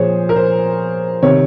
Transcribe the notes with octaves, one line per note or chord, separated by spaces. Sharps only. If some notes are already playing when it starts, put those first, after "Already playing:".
Already playing: A#2 F3 G#4 C5 C#5
A#4
C5
C3 D#3 C#5